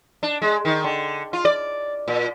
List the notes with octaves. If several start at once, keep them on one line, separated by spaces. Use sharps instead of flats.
D4
G#3
D#3
D3
F4
D5
A#2